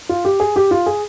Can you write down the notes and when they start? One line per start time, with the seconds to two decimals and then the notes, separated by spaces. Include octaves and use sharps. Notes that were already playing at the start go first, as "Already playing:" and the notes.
0.09 F4
0.25 G4
0.40 G#4
0.56 G4
0.71 F4
0.86 G#4